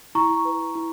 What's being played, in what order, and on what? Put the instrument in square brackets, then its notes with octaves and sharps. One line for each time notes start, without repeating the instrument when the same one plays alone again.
[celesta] E4 A#5 C#6
B4
E4